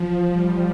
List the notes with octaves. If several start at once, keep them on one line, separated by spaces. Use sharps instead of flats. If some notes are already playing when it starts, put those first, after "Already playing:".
Already playing: F3
G3